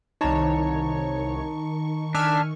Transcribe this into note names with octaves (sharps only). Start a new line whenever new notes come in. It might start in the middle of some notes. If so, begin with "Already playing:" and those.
C2 D#3 D#4 C#5 A5 A#5 C#6
D4 E5 G#5 F6